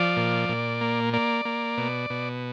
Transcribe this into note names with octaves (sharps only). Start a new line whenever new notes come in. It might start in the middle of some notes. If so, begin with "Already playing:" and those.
Already playing: F3 D5
A#2
A#2
A#3
A#3 D5
A#3
B2
B2